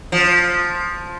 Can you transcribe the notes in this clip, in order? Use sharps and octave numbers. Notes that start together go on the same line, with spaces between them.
F3